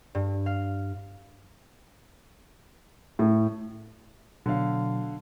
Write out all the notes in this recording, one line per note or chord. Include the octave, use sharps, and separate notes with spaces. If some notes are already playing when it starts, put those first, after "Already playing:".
G2
F5
A2
B2 D3 F#3 F5